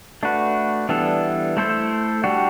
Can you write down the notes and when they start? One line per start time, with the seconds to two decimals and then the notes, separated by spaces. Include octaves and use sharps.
0.23 A3 D4 F#4 B4
0.89 E3 G3 B3 D4 A4
1.57 A3 E4 A4 C5
2.24 G3 D4 F#4